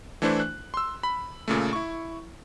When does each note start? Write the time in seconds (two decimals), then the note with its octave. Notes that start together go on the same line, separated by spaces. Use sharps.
0.22 E3 A3 D4 E4 C5
0.40 F#6
0.74 C6 E6
1.03 B5
1.48 A#2 C#3 A3
1.73 E4 C#6